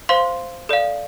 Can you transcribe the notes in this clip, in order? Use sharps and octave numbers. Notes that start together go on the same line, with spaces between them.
C5 F5 C6
A4 D5 F5